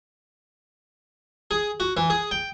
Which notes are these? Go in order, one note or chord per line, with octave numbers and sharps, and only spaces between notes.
G#4
F#4
E3
G#4
G5